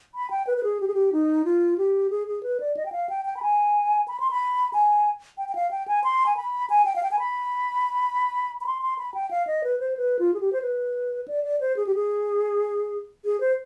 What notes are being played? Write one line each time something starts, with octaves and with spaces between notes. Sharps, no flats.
B5
G5
B4
B4
G#4
G4
G#4
G4
D#4
F4
G4
G#4
G#4
B4
D5
D#5
G5
F5
G5
G5
B5
G#5
B5
C6
B5
G#5
G5
G5
F5
G5
G#5
C6
G#5
B5
G#5
G5
F5
G5
G#5
B5
B5
C6
C6
B5
G5
F5
D#5
B4
C5
B4
F4
G#4
G4
C5
B4
D5
D5
C5
G#4
G4
G#4
G#4
C5